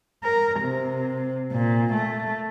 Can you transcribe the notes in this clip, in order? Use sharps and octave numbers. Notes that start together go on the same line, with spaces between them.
A#4
C3
A#2
A3